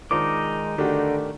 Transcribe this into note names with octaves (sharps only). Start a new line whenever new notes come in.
D#3 G#3 D4 D#4 F4 C5 D6
D3 D#3 A3 D4 F#4 G4